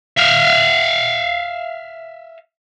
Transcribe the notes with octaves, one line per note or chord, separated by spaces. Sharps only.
E5 F5